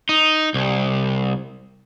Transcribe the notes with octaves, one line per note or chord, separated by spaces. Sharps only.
D#4
C2